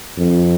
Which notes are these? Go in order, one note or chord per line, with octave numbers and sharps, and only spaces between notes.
F2